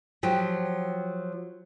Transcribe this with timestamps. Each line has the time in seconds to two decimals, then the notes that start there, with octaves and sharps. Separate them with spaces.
0.23 F3 F#3 G4